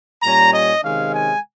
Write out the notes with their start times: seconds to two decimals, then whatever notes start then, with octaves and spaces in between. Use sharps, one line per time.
0.23 A#2 G3 C#4 A#5
0.54 D#5
0.84 C3 D#3 G#3 C#4 F5
1.14 G#5